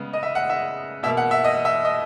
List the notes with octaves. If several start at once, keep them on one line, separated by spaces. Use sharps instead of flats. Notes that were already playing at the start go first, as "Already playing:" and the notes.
Already playing: C#3 G#3 B3
D#5
E5
F#5
E5
B2 A#3 E5
F#5
E5
D#5
E5
D#5